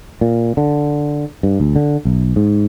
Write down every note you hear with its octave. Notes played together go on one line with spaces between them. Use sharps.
A#2
D3
G2
D2
D3
B1
G#2